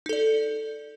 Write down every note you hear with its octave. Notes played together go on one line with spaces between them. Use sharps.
D#4 A4 D5